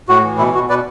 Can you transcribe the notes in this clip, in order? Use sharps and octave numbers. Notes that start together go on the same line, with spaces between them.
A2 F#4
E3
B2 E4
B2 F#4
B2 B4 D5